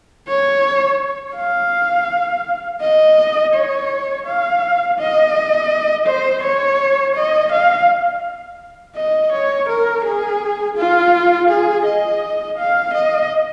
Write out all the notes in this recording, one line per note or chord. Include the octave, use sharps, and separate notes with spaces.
C#5
F5
D#5
C#5
F5
D#5
C5
C#5
D#5
F5
D#5
C#5
A#4
G#4
F4
G#4
D#5
F5
D#5